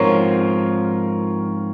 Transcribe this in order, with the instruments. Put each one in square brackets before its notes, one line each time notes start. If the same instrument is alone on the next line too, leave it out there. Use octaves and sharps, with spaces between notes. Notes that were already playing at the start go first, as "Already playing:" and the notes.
Already playing: [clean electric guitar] G#2 F3 C4 F4 [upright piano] A#4 C#5